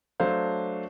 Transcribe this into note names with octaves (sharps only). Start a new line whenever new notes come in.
F#3 A3 D4 C5 F5